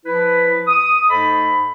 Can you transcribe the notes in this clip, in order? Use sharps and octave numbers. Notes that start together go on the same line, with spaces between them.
F3 E4 B4
D#6
G#2 A3 A4 C5 D#5 B5